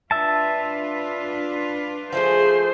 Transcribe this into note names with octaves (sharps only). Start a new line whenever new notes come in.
D4 F4 B4 E5 A5
F3 A3 G#4 C5